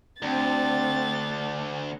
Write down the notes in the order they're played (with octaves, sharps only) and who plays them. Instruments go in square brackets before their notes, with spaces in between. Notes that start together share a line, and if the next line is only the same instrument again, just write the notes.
[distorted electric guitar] D2 [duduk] C4 [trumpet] D4 [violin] A6